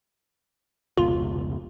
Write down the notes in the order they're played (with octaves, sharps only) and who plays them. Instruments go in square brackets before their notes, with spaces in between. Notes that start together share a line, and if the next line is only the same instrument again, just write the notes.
[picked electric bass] F1 C#2 B2 [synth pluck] F4